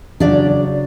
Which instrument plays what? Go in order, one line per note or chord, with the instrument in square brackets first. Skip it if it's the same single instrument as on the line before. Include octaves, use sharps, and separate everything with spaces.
[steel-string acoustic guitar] C#3 F#3 D4 D5